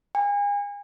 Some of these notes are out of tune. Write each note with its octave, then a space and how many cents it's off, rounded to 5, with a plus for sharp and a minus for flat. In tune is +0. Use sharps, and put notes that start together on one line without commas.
G#5 -35